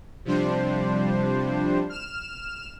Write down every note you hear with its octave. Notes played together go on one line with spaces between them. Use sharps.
C3 F3 G3 D4 C5
F6 E7